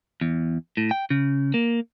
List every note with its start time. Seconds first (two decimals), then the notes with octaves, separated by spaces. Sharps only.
0.21 E2
0.77 A2
0.91 G5
1.10 C#3
1.54 A#3